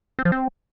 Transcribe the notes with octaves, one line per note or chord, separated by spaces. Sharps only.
C4
F3
C4